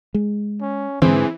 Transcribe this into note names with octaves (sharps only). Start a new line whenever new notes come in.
G#3
C#4
G#2 D3 E3 C4 G#4